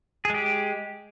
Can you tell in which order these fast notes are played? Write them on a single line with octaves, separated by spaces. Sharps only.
G#4 G#3 G4